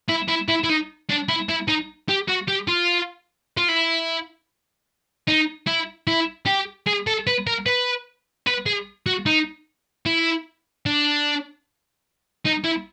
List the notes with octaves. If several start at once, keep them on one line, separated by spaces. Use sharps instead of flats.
E4
E4
E4
E4
D#4
D4
E4
E4
D#4
G4
F#4
G4
F4
F4
E4
D#4
E4
E4
G4
G#4
A4
B4
A#4
B4
B4
G#4
F#4
D#4
E4
D4
D#4
E4